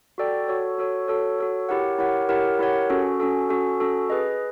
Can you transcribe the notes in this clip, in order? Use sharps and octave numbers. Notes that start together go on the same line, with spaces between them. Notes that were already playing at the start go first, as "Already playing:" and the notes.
F#4 A4 D5 G5
F#4 A4 C#5
F#4 A4 C#5
F#4 A4 C#5
F#4 A4 C#5
E4 G4 A#4 C#5 F#5
E4 G4 A#4 C#5 F#5
E4 G4 A#4 C#5 F#5
E4 G4 A#4 C#5 F#5
C#4 F#4 A4
C#4 F#4 A4
C#4 F#4 A4
C#4 F#4 A4
G#4 B4 D#5